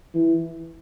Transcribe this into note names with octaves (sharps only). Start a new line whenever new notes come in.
E3